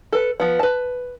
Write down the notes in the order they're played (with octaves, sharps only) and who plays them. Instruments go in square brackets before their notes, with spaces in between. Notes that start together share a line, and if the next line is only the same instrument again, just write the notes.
[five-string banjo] A4 B4
F3 B3
B4 A5